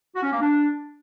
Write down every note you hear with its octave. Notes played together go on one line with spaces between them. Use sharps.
F#4
C#4
A#3
D4